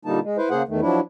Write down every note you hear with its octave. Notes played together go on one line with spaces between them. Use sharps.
A#2 D3 G3 A#3 D#4 A5
G#3
E4 B4 C5
C#3 A#3 G#4 C5 F#5
E2 D#3 A3
F3 F#3 D4 E4